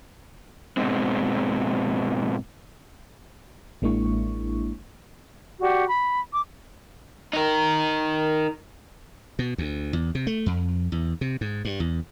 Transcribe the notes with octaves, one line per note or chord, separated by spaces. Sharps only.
G#2 B2 G#3 C4
A1 G#3 A#3 D4 E4 C#6
F#4 G4 D5 F#5
B5
D6
D#4 A#4
B2
D2
E2
C3
A3
F2
E2
C3
G#2
G2
E2